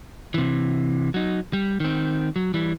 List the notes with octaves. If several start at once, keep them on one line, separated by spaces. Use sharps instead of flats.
C3 E3
F#3 D#4
G3
D#3 C4
F#3
E3 G3